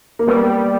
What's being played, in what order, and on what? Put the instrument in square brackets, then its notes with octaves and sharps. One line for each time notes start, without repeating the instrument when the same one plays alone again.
[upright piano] A#3
[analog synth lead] G3 [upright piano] B3